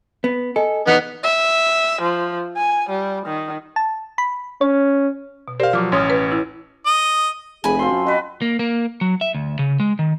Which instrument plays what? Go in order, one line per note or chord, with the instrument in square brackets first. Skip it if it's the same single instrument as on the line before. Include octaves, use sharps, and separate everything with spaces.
[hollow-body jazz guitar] B3
[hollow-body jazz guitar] A4 [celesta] D#5 G#5
[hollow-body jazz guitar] E2 [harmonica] B3 D#4 B4 [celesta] F#5 F#6 B6
[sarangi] E5
F3
G#5
G3
D#3
[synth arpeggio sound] A5
B5
[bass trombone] C#4 [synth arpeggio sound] C#5
[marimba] B2
[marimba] G4 A#4 D5 [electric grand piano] C5 F5
[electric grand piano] F3 F#3 [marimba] D6 F6
[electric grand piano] A1 C#4 C#5 [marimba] C6 D#6 F6
[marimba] B4
E4
[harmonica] D#5
[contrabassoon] F1 [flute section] G#4 [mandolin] G#5 B5
[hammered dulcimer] F3 C4 C6 [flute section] F#4
[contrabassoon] F#2
[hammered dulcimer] F#4 B4 [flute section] D#5
[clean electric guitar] A#3
A#3
F#3
E5
D2
C#3
G#3
D#3